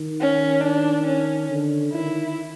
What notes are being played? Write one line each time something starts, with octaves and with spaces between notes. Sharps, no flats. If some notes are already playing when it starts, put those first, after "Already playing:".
Already playing: D#3
C#4
D4
C#4
D3
D#3 E4